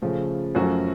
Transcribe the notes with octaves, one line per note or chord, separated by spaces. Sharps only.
C#3 F3 A3
F#2 F3 A3 C#4 F#4